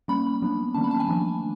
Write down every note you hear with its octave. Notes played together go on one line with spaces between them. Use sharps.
G3 A#3 C#4 B5
F#3 B3 D4
D#3 G3 A#3 C#4 A5
B5
A5
G#5
F3 A3 D4